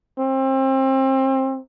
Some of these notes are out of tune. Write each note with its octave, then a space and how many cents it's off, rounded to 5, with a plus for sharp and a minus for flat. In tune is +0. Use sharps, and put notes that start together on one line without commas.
C4 +30